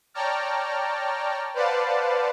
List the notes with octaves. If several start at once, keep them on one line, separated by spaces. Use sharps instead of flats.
C#5 D5 G5 A5 A#5 F6
B4 C5 D5 F5 F#5 A5